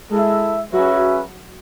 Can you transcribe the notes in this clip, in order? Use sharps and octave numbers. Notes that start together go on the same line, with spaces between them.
G#3 E4 A4 E5
F#3 C#4 F#4 G#4 B4 E5